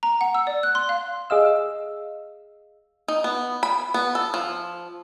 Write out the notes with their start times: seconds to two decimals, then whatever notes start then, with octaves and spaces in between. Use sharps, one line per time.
0.03 A#5
0.21 F#5
0.34 E6
0.47 D5
0.63 F#6
0.75 C6
0.89 F5
1.30 G#4 D#5 F5 E6
3.08 D#4
3.24 B3
3.63 B5
3.94 B3
4.15 A4
4.34 F3